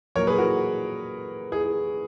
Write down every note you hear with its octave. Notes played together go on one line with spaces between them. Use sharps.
A#2 F#3 A#4 C#5
G#4 B4
F#4 A#4
G#4